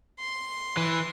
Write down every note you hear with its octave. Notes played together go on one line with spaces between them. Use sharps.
C6
E3